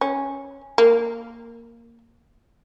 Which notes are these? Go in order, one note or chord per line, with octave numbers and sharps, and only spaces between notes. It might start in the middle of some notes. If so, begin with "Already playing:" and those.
C#4
A#3